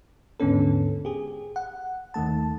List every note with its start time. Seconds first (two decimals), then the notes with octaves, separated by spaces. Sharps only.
0.40 D#2 G#2 D3 B3 C#4 A4
1.05 G4 G#4
1.56 F#5
2.14 D#2 D#3 A3 A5